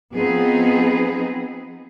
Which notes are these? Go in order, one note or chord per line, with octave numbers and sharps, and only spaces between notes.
F3 B3 C4 D#4 G#4